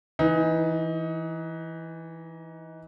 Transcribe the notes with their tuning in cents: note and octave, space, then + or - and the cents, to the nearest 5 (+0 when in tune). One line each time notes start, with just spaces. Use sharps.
E3 +0 D#4 +25